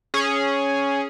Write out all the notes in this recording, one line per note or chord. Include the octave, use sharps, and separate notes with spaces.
C#4 G#4